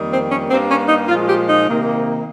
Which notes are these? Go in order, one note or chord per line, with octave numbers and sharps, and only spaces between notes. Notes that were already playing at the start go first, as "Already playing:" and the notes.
Already playing: F2 D#3 G3 A#3
C4
C#4
G2 G3 A#3 C4
C#4
D#4
A#2 F3 G#3 F4
G4
D#4
C3 D#3 A#3